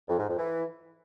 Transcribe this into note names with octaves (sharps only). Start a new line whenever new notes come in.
F2
G#2
F2
E3